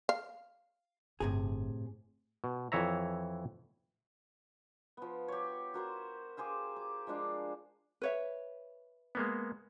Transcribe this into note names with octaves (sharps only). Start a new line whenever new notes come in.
F5
G1 A2 C3 G#4
B2
F2 E3 C#5 E5 A#5
F3 B3
G4 C#5
F#4 A#4 C5
G4 G#4 C5 F5
D6
F3 G#3 D4 F5
B4 C#5 E5
G#3 A#3 B3